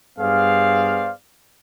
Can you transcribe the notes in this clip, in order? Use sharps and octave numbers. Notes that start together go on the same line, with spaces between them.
G2 B3 G#4 C5 D5 F5